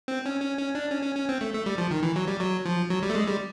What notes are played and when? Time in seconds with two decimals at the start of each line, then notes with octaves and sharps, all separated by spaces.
0.08 C4
0.26 C#4
0.42 C#4
0.58 C#4
0.75 D4
0.91 C#4
1.03 C#4
1.17 C#4
1.29 C4
1.41 A3
1.54 A3
1.66 G3
1.78 F3
1.91 D#3
2.03 E3
2.16 F#3
2.28 G3
2.40 F#3
2.66 F3
2.90 F#3
3.03 G3
3.10 A3
3.15 G#3
3.28 G3